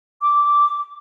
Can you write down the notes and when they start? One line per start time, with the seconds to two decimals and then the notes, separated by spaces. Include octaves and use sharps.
0.21 D6